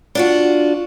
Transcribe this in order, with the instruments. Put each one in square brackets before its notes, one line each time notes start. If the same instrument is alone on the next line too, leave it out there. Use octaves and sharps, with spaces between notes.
[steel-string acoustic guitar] D4 F4 F#4